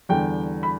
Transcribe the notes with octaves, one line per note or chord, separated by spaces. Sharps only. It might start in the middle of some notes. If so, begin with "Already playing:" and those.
E2 D3 G3 G5
B5